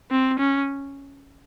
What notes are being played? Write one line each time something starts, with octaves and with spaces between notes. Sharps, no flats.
C4
C#4